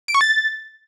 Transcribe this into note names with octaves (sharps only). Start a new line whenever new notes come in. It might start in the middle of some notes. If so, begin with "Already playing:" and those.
D7
C#6
A6